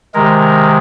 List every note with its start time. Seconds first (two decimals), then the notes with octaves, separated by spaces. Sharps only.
0.14 C3 D#3 G#3 A#4